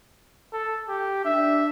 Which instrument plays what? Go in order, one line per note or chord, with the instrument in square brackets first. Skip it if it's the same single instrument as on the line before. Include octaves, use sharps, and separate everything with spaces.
[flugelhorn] A4
G4
[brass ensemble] D4 [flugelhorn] E5